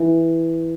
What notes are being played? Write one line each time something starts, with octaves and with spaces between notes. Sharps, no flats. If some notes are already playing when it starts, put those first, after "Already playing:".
Already playing: E3